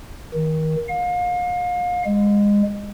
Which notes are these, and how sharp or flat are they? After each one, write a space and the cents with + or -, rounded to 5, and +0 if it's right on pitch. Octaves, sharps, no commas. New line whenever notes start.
D#3 +25
F5 +35
G#3 -25